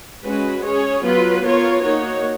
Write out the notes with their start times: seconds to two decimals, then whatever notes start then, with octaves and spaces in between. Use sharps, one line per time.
0.23 G#3 C#4 F#4 B4
0.63 C#4 G#4 C#5
1.03 F#3 B3 F4 B4
1.43 B3 F4 A#4 C#5
1.83 A#3 D#4 F#4 C#5